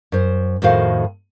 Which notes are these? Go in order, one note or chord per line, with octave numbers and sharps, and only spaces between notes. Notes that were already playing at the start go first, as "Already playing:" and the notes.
F#2 C5
F2 A2 D#3 F#4 C5 F5